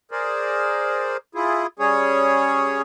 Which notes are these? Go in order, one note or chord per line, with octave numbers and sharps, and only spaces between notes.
G#4 A#4 C5 D5
E4 F4 G#4
G3 C#4 G#4 C#5